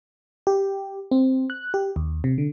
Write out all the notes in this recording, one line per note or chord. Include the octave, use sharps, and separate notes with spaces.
G4
C4
F#6
G4
D#2
C3
D3